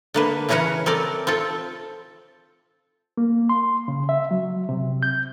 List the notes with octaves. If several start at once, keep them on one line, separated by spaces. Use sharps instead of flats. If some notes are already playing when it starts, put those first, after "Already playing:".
D3 A#3 B4
C#3 E3 C#4 A#4 B4 F#5
C4 A4 A#4 D5
C4 F4 A4
A#3
C6
C#3
E5
F#3
C3
G6